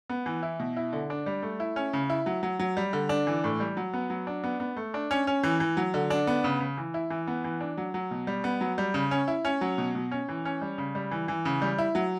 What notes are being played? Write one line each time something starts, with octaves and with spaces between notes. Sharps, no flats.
B3
E3
E4
B2
E4
D3
D4
G3
A3
E4
C#4
C#3
E4
F#3
F#3
F#3
G3
D3
D4
E3
A2
G3
F#3
B3
F#3
D4
B3
B3
A3
D4
C#4
C#4
E3
E3
F#3
D3
D4
B3
C#3
C#3
E3
E4
E3
B3
E3
D4
F#3
F#3
B2
G3
B3
F#3
G3
C#3
C#4
E4
C#4
F#3
B2
B2
C#4
E3
C#4
G3
C#3
G3
E3
E3
C#3
G3
E4
F#3